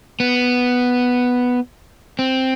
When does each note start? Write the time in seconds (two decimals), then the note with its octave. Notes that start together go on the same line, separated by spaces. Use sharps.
0.20 B3
2.19 C4